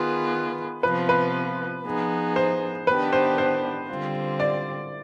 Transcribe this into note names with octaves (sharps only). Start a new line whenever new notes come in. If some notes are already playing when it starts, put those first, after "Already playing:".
Already playing: D#3 B3 F4 G#4 B4
C3 F3 B3 F4 B4
B4
F3 B3 D#4 G#4
C5
D#3 B3 D4 G4 B4
C5
C5
D3 G3 C4 F4
D5